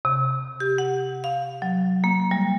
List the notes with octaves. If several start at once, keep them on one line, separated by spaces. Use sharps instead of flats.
C3
G4
F#5
F5
F#3
A#3
G3